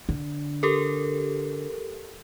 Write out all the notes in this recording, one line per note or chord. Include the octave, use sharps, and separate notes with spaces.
D3
G4 A4 A#4